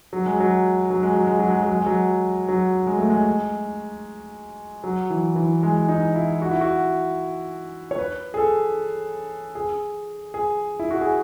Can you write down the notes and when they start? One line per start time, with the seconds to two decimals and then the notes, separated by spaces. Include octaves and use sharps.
0.13 F#3
0.26 G#3
0.40 F#3
0.90 F#3
1.03 G#3
1.15 F#3
1.27 G#3
1.39 F#3
1.50 G#3
1.62 F#3
1.75 G#3
1.86 F#3
2.49 F#3
2.87 G#3
2.99 A3
3.10 G#3
4.84 F#3
5.10 E3
5.36 E3
5.63 G#3
5.89 D#4
6.15 E4
6.42 F#4
6.51 E4
6.61 F#4
7.91 C#5
7.99 B4
8.34 G#4
8.37 A4
9.55 G#4
10.34 G#4
10.79 E4
10.91 F#4
11.01 G#4